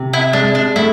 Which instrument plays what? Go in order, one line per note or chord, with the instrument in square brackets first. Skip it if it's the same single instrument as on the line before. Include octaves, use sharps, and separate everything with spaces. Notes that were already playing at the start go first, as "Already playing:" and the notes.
Already playing: [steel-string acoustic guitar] C3
[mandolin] E4
[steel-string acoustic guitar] G#3 [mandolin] D4
[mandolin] D4
[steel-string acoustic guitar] A3 [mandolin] E4